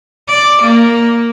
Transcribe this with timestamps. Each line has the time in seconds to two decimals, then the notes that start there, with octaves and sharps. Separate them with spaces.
0.27 D5
0.62 A#3